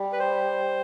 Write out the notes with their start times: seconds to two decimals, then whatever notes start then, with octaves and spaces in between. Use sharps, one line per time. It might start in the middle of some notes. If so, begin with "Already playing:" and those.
Already playing: G3
0.13 B4
0.19 C5